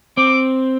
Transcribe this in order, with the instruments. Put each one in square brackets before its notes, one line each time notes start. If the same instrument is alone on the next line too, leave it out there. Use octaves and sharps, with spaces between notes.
[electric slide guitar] C4 [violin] D6